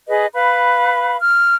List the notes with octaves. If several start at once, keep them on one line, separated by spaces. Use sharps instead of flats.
G#4 B4 D#5
B4 F5 B5
F6